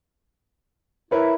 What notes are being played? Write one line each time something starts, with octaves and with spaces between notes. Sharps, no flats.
E4 A#4 B4 C#5